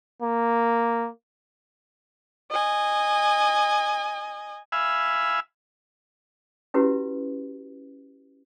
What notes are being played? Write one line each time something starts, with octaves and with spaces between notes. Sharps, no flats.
A#3
D#5 G#5
E5 F5 G#5 B5 E6
C#4 E4 F#4 G4 B4